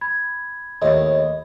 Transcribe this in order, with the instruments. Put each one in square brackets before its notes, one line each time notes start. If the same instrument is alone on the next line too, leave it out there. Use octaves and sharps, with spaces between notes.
[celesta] B5 G#6
[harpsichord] D#2 A2 [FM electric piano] D#5